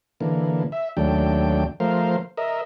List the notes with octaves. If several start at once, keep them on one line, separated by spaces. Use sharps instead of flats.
D3 E3 A#3
E5
D#2 F#3 A3 D4 G5
F3 A3 A#4 C5 F5
A#4 D#5 E5